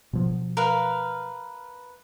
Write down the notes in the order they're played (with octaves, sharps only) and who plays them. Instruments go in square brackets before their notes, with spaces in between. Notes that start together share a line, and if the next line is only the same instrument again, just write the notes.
[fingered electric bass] B2 F3 F#3
[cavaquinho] A#4 B4 F5